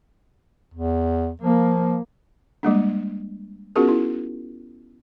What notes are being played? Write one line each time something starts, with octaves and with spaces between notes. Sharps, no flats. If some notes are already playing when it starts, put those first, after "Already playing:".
E2
F3 A#3
G3 G#3 A#3 D4
B3 C#4 F4 F#4 G#4 A#4
E4